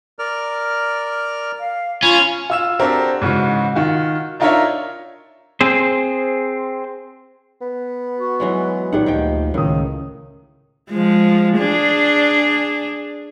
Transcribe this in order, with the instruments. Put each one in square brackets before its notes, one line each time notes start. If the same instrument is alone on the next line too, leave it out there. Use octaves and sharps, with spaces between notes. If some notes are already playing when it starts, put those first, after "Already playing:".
[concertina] A#4 D5 F6
[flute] F5
[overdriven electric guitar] C#4 [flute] F4 [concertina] G#5 B5
[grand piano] F4 E6 E7
C4 D4 F#4 G4 A4 A#4
G#2 C#3 E3 F#4
D#3 F4 F#4
D4 D#4 F4 A#4 C#5 E5
[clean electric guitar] C4 G#4 C5
[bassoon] B3
[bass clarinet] F#4
[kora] E3 F#3 G#3
[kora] A#2 D#3 F#5 [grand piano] D#4 G4 D#5
[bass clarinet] D2 [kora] D#3 F3 G5
[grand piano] C#2 D#6 [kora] A2 [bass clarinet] D#3
[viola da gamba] F3 G#3
D4 G#4